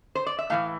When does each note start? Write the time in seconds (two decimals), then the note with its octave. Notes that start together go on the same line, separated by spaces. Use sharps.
0.15 C5
0.26 D5
0.38 E5
0.50 A2 E3 A3 F5